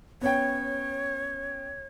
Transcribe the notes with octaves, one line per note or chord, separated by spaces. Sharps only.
B3 C#4 C#5 G5